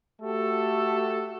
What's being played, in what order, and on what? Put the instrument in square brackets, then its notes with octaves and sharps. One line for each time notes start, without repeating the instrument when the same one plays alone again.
[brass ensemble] A3 F#4 G4 A4